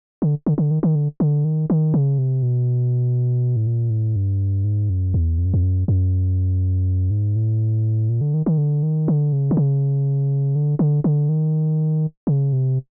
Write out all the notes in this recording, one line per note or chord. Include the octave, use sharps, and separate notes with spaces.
D3
D3
D3
D#3
D#3
D3
D3
D#3
D#3
C#3
C3
B2
A2
A#2
A2
G2
G#2
F#2
E2
F2
F#2
F2
F#2
F#2
G#2
A2
A#2
D3
D#3
D#3
D3
D#3
D3
C#3
D3
C#3
D3
D3
D3
D#3
C#3
C3